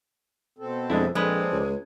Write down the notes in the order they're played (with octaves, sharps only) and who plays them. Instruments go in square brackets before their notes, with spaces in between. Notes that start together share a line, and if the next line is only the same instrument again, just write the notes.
[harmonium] B2 C4 A4
[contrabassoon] F2 [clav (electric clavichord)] G#3 D4 E4
[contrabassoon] A#1 [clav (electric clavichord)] F3 B4 [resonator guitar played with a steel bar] G#3 [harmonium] C4 A4 D5
[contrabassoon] C#2